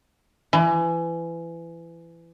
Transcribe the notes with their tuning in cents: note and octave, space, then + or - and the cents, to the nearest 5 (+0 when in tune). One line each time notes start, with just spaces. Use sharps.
E3 +25